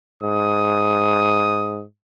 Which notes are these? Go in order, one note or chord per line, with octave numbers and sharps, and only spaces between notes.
G#2 D#6